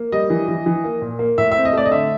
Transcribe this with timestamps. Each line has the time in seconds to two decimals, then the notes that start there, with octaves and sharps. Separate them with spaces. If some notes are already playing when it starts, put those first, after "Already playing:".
Already playing: A#3
0.12 G3 D#5
0.30 E3
0.48 E3
0.66 E3
0.84 A#3
1.02 A#2
1.19 A#3
1.38 A2 E5
1.52 C4 E5
1.65 D#5
1.73 A3 D5
1.86 D#5
1.91 D3 E5